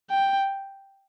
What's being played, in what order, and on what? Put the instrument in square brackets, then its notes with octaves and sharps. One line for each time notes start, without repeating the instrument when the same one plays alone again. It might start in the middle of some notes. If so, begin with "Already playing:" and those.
[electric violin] G5